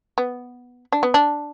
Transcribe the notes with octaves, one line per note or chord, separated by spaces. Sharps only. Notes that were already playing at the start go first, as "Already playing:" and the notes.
B3
D4
B3
D4